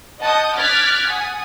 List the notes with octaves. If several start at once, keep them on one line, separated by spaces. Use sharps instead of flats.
D#5 F#5 A5 D#6 G6
D6 F6 F#6 G#6 A6 B6
F#5 G#5 D#6